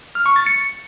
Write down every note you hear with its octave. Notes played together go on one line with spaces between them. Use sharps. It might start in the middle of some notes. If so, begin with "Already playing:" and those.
F6
C#6
A6
C#7